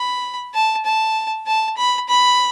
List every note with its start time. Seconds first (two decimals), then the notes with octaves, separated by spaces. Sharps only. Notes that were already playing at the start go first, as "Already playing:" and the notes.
Already playing: B5
0.55 A5
0.85 A5
1.47 A5
1.77 B5
2.09 B5